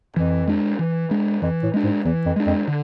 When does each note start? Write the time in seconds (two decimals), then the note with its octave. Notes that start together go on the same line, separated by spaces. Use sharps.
0.16 F2 E3
0.47 G#3 D4
0.79 E3
1.11 G#3 D4
1.42 F2 E3
1.63 A2
1.74 G#3 D4
1.84 G#2
2.05 E2 E3
2.26 F2
2.36 G#3 D4
2.47 F2
2.68 D3